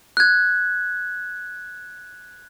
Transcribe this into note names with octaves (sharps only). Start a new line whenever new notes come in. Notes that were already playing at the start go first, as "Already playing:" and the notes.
F#6 G#6